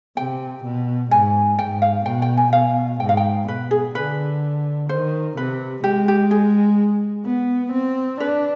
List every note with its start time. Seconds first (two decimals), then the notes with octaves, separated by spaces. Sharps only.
0.17 C3 G5
0.64 B2
1.11 G#2 G#5
1.59 G#2 G5
1.82 F5
2.06 B2 G5
2.22 G5
2.37 G#5
2.53 B2 F5
3.00 G#2 G5
3.09 F5
3.17 G5
3.48 B2 B4
3.71 G#4
3.95 D3 B4
4.89 D#3 C5
5.37 C3 B4
5.84 G#3 G4
6.08 G4
6.31 G#4
7.26 B3
7.74 C4
8.20 D4 B4